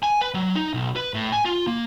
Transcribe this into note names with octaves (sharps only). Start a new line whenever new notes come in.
G#5
B4
F#3
D#4
B1
B4
A2
G#5
F4
A#3